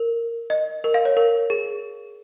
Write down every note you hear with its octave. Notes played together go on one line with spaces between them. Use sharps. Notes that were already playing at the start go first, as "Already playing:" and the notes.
Already playing: A#4
D#5
A#4
F5
C#5
A#4
G#4